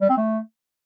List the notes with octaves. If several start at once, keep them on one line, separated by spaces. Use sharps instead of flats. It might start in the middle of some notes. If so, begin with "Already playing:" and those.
G3
C4
A3